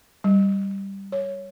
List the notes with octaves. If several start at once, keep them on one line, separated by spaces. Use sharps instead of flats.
G3
C#5